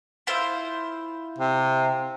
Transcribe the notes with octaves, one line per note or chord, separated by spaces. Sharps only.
E4 F4 C5
C3